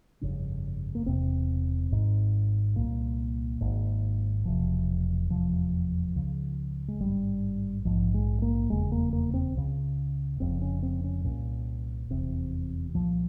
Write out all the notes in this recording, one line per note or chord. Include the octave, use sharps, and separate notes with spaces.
G1 F2 C#3 C#4
A#3
E1 E2 C3 C4
G#1 G#2
C2 A#2 A#3
G#1 G#2
E1 E2 C3 F3
F1 E2 C3 F3
C#2 C#3
G#3
G#1 G2 G3
A#1 G#2 F3
G#3
A#3
F1 E2 C#3 G#3
A#3
A#3
C4
C#2 C#3
F1 F2 C#3 C4
C#4
C4
C#4
C2 A#2 C#4
F1 E2 C3 C4
C2 A#2 F3